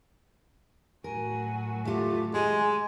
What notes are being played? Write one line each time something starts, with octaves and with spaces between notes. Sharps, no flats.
A2 F#3 F#4 A#4 G#5
A3 F4 G4
G#3 G#4 G#5